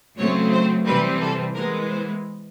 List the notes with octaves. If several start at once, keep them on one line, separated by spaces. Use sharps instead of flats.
C#3 F#3 A3 C4 C#5
C5
C3 E3 G3 C4 B4
A4
E3 G#3 B3 A#4
C5